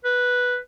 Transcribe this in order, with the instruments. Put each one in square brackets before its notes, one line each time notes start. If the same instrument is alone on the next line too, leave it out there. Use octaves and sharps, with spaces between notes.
[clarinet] B4